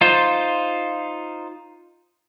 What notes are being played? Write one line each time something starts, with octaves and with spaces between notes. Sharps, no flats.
D#4 F4 C5